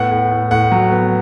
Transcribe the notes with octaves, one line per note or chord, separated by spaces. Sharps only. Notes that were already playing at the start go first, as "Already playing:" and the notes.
Already playing: A2 B3 F#5
A2
A2
A2 F#5
F#3
B3